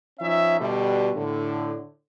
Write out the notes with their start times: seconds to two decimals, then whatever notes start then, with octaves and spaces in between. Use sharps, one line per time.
0.20 F3 C#4 D#4 E5
0.60 B2 D3 G3
1.16 A2 D3